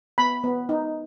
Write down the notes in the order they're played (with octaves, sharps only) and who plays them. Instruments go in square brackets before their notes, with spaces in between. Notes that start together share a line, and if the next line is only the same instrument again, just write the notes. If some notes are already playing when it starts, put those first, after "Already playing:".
[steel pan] B3 B5
B3
D#4